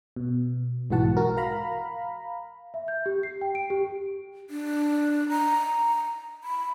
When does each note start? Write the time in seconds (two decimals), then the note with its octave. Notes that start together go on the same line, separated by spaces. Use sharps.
0.16 B2
0.90 B1 G#2 E3 F#4 F#5 A5
1.17 F#4 A#4
1.37 F5 A#5 B5
2.74 E5
2.88 G6
3.06 G4
3.23 C7
3.41 G5
3.55 D7
3.70 G4
4.50 D4
5.29 A#5
6.44 B5